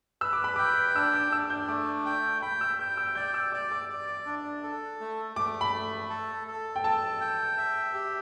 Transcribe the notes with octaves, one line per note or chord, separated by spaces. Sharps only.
B4 E6
D6
B5
G5 D6
D4 E6
D6
D4 E6
G6
A3 D6
G5
G5 B5
E6
G5 G6
E6
D5 G6
E6
D5 D6
D6
D5
D4
A4
A3
A3 D6
B5
A3
A4
A4
G5
A4 A5
G5
E5
G4